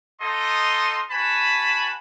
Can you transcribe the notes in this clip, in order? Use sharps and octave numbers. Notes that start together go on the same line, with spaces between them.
D#4 F4 A4 D#5 C6
F#4 B4 G#5 A5 B5